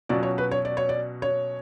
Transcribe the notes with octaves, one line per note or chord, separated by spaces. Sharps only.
B2 F#3 C#4 F4 D5
C#5
B4
C#5
D5
C#5
D5
C#5